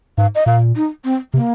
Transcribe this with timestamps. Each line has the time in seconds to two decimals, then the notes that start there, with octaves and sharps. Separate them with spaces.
0.18 G#2 F5
0.35 D#5
0.46 A#2 F5
0.76 D#4
1.04 C4
1.34 C3 A#3